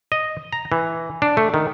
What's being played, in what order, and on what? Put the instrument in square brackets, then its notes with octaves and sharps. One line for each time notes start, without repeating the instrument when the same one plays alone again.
[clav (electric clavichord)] D#5
A#5
E3
D4
A3
D#3